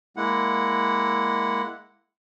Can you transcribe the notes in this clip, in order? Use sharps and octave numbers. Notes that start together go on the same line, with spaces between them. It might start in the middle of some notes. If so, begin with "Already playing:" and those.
G#3 A#3 E4 F#5